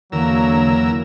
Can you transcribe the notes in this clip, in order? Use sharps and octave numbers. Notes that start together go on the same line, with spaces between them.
E2 D3 F#3 A#3 A#4 E6